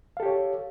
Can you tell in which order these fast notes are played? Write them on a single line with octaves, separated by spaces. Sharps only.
F5 A4 G4 C#5